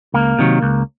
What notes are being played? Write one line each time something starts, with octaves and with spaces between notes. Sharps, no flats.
C#2 A#3
C3 D#3 F#3
C#2